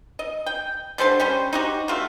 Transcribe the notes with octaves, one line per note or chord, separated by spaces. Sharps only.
D#5
G5
D3 G3 C5 A5
G3 C#4 C5
D#4 F#4 G4
A3 F4 F#4